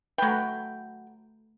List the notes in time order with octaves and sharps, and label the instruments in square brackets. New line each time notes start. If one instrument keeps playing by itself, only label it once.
[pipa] F#3 G5 [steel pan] A3 B4